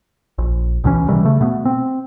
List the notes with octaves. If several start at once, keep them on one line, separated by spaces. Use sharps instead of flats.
A#1
C#2 B2 E3 C#4
C3 D#3 E3 G3
C#3 A3
B2 A3 B3
C4